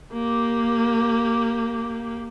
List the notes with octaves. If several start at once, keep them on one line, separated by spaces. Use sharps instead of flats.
A#3 G4